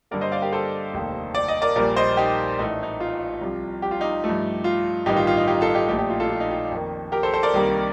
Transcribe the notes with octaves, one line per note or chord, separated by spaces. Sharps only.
G2 D3 G3 A#3 A#4 D5
C5 D#5
D5 F5
G4 A#4
A4 C5
F1 D#2 D#3
D5
D#5
A#4 D5
A#1 A#2 G3 A#3 A#4 D5
C5 D#5
D#4 G4
A1 A2 A3 D#4
D#4
F4
C2 C3 F3
G4
F4
D#4 G4
G2 F3 A3
F4
A1 G2 D#3 D#4 G4
F4
F4
D#4
D#4 G4
F4 A4
D#4 G4
A#1 A#2 A3 D#4 G4
D#4 G4
F4
F4 A4
F4
D#4
F4
F2 D#3 A#3
G4 A#4
A4 C5
A4 C5
A#4 D5
C2 C3 D#3 G3 A#3